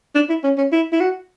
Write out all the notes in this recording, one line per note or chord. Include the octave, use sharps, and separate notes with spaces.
D4
E4
C#4
C#4
E4
E4
F#4